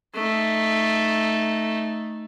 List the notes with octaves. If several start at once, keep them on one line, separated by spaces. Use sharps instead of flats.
A3 D#4